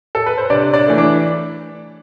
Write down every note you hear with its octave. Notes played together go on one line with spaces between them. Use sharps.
A4
B4
C5
C3 D4 D5
D4 D5
E3 A3 D4
D4 D5